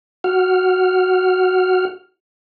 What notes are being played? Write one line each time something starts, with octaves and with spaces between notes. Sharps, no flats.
F#4 F#5 F6